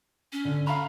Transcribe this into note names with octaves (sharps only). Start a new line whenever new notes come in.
C#4
D3
F5 A#5 B5